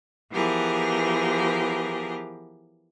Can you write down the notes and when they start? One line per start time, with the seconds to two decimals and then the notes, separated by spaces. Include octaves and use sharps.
0.32 E3 F3 B3 G4 G#4 A#4